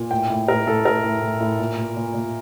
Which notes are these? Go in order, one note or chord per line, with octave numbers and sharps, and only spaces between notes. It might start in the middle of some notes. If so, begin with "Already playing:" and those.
Already playing: A#2
A2 G5
A2
A2 A#4
A2 A4
A2 A#4
A2
A2
A2
A#2
A#2
A#2
A#2